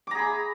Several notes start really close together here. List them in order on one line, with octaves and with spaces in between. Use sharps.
D6 A#5 G#4 B5